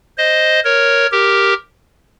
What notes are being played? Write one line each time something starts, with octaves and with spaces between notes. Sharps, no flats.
C5 D#5
A#4 C#5
G4 A#4